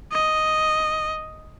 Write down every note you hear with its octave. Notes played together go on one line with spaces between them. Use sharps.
D#5